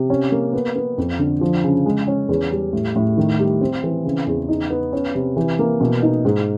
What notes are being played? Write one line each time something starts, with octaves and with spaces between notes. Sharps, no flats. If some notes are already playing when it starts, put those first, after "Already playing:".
Already playing: C3
C#4
A#3
B3
B3
F2
D3
F3
C#3
G#3
C#4
E2
G3
A2
A2
D#3
G3
C4
E3
C#3
E2
D#4
B3
C#4
C3
E3
A#3
B2
D#4
G#2